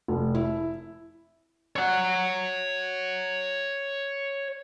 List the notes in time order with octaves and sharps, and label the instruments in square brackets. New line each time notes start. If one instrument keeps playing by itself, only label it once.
[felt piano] F1
E4
[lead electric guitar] C#5 F#5